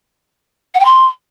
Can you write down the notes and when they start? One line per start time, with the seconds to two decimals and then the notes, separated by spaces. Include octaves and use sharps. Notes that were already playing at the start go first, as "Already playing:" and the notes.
0.74 F#5
0.80 G5
0.85 C6